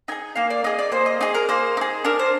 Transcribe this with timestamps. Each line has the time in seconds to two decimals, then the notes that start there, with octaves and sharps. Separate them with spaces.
0.08 D#4 G#4 G#5
0.36 A#3 F5
0.50 D5
0.64 D#4 G#4 D#5
0.79 D5
0.92 A#3 C5
1.06 D#5
1.21 D#4 G#4 D#5
1.34 A#4
1.49 A#3 C5
1.77 D#4 G#4
2.05 D4 A#4
2.19 C5